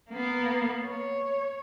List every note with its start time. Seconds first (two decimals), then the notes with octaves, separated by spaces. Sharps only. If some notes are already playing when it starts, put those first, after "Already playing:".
0.11 A#3 B3
0.84 C#5